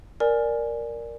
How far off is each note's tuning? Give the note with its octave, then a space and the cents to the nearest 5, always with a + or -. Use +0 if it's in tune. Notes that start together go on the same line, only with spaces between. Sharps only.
A#4 +0 D5 +0 G#5 +0